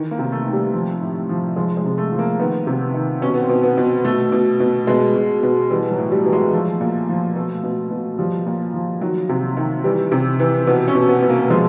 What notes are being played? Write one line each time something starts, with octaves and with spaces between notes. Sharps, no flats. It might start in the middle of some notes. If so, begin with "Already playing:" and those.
Already playing: D#3 E3
A#3
C3
A3
D#3
G3
F3
A2
F3
F3 G#3
G#3
C3
A3
F3
A#3
D#3 B3
C3
D#3
B2 C#4
B3
C4
B2
B3
B2
B2 A3
B2
B2
B2 G#3
B2
B2
E3 G3
F#3
A2
G3
E3
G#3
F3 A3
A#2
F3
B2 A3
B2
B2
F3 G3
A#2
F3
D#3 F#3
C3
D#3
E3 G3
C3
E3
B2 B3
C#4
B2
B3
B2
A#3
F3 G#3